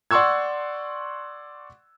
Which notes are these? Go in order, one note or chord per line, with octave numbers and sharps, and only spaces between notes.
D5 F#5 C6 C#6 E6 G#6